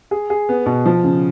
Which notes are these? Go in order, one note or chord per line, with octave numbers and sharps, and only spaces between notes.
G#4
G#4
B3
B2
F3
C#3